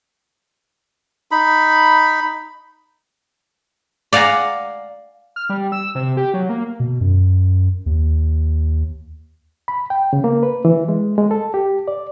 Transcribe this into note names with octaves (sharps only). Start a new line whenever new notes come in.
D#4 B5
D5 F5 F#5 G#5 A#5
F6
G3
E6
C3
G4
F#3
A#3
B2
F#2
D#2
B5
G5
C#3
A#3
B4
E3
G#3
G#3
A4
G4
D5